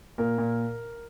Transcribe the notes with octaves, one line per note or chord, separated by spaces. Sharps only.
A#2 A#4
A#2